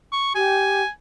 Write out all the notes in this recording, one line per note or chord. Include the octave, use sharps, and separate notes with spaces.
C#6
G4 G#5